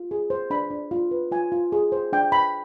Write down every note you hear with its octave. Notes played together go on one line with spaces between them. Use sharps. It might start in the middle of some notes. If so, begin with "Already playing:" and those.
Already playing: F4
G#4
C5
D4 B5
D4
F4
B4
F4 G#5
F4
G#4
C5
D4 G5
D4 B5